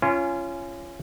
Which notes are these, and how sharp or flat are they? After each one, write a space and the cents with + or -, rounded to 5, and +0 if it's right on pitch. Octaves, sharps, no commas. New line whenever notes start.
C#4 +0 F4 -30 G#5 +10